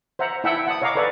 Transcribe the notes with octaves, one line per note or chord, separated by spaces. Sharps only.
C5 E5 F#5 A#5
E4 E5 F#5 G5 A5 E6
F#5 A5 D#6
C#5 D#5 F5 F#5 A#5 D6
A4 B4 C#5 D5